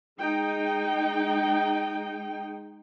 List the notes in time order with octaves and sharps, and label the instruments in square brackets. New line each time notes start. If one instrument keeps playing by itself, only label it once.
[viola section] G#3 D#4 G5